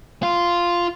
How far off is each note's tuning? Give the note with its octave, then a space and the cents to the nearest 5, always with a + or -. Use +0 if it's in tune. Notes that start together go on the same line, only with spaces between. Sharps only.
F4 -5